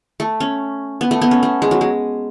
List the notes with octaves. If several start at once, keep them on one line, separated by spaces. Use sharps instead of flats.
A3
C#4
B3
A3
B3
C#4
A3
G#3
F#3
G#3